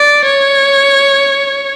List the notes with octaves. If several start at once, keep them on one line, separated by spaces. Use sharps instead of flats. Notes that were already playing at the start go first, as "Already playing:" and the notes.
Already playing: D5
C#5